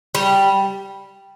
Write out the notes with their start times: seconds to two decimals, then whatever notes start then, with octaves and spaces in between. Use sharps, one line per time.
0.15 G3